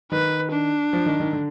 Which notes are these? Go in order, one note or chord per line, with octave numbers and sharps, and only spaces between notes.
D#3 B4
D4
F3
D#3
D#3
D3